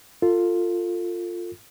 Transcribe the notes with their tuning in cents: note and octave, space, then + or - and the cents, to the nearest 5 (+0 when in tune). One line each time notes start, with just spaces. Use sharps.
F4 +0 A4 +30